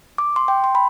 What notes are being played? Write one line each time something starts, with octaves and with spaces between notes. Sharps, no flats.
D6
C6
G5
C6
B5